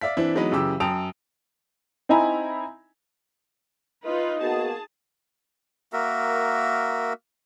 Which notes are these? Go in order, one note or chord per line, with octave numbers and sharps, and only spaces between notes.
D5 E5 F5 B6
E3 C4 D4 E4
E3 F#3 G#3 B3 D#4 B4
F#2 C#3 E3 G4 D6 E6
F#2 G5 A5 D#6 D7 F7
C4 D#4 E4 G#5 A#5 B5
D#4 F4 B4 D#5
A#3 B3 F#4 G#4 A5
A#3 F#4 A#4 E5